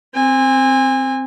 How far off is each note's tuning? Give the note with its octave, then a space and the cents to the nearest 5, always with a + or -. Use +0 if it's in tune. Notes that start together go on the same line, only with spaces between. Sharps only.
C4 +0 G#5 -30